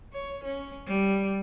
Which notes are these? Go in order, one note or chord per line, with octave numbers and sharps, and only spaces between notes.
C#5
C#4
G3